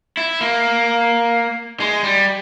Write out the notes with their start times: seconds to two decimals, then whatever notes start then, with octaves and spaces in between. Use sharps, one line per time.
0.17 E4
0.41 A#3
1.80 G#3
2.04 G3